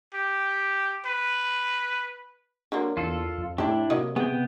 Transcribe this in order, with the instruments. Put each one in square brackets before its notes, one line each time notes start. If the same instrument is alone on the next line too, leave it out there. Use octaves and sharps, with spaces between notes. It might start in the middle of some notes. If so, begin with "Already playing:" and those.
[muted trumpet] G4
B4
[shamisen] D3 F#3 A#3 [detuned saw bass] D4
[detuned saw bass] E2 [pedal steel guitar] F4 A4
[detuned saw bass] F2
[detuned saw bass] A2 [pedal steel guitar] D4 E4 [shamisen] G4 A4
[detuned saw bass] C3 [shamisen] F#3 A#3 D#5
[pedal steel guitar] B3 G5 [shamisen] E4 G#4